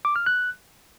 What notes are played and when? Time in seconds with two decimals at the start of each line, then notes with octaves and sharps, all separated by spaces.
0.05 D6
0.16 F6
0.26 F#6